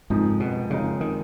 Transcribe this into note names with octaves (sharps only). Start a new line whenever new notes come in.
F#1 F2 G#2 F3 G#3 D#4
B2
F#1 F2 C#3 F3 G#3 D#4
D#3